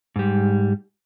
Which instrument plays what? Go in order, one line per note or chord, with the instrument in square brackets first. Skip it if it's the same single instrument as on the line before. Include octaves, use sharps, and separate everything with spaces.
[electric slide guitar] G#2 G3